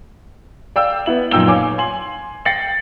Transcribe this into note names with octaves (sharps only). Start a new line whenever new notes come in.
D5 F5 G5 E6
B3 E4 F#7
F#2 A#2 D#4 G5 E6 G7
C#5 F5 G#5 D6
G#5 C6 F#7
G5 A6 A#6 C7 C#7 F#7